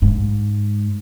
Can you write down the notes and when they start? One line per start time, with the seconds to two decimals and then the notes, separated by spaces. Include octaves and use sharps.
0.02 G#2